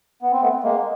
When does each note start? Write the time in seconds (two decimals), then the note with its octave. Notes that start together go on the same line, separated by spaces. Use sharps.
0.22 B3
0.32 C4
0.42 A3 B3
0.63 G#3 A#3